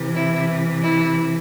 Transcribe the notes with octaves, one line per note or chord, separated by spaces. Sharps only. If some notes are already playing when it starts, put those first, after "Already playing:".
Already playing: C3 E3
E4
E4